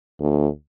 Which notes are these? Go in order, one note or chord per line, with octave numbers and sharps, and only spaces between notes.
D2